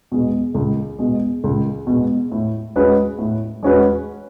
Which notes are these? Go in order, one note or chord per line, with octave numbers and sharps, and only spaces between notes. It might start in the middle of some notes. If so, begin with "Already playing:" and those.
B2 G#3
C#2
B2 G#3
C#2
B2 G#3
A2
G#3 C#4 F#4 B4
A2
G#3 C#4 F#4 B4